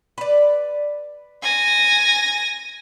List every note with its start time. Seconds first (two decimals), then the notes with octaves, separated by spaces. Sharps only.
0.18 B4 D5
1.42 G#5 A#6